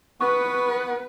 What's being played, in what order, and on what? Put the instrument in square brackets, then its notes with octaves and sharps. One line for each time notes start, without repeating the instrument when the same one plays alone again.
[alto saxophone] B3 [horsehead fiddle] B4 [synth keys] C#6